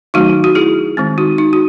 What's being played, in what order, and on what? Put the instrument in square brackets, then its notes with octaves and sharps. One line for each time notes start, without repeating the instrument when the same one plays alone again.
[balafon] D#3 F#3 A3 D#4 F#4
F#4
E4 G#4
D#3 G#3 C4
D#4 F#4
D#4
F#4